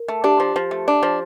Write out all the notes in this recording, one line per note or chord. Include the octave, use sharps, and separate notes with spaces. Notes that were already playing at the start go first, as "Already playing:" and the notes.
Already playing: A#4
A3
D4 G4
F3
F3
A3
D4
F3